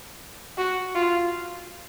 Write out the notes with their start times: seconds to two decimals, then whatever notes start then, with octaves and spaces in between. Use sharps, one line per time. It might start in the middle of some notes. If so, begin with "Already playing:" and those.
0.58 F#4
0.95 F4